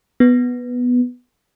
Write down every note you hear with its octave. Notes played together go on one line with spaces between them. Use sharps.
B3